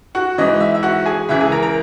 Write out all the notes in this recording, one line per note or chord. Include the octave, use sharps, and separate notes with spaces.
F#4 F#5
G#2 E3 D#5
E5
E5
F#4 F#5
G#4 G#5
C#2 C#3 E3 E5
G#4 G#5
A#4 A#5
A#4 A#5